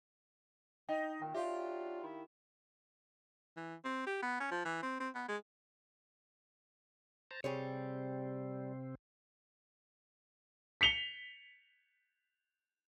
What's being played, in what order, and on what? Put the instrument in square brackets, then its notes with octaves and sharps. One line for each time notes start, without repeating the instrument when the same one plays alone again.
[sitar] D#4 [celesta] D#5 G5
[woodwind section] A#2 D#3 [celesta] G5
[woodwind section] F#3 D4 F4 [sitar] G4 [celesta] E5 F5
[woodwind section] D#3 E4
[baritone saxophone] E3
C4
G4
B3
C#4
F3
E3
C4
C4
B3
G#3
[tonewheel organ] C5 A5 A#5
[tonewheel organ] C3 C4 [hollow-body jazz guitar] G3 G#4 C#5
[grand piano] B6 C#7 F7 G7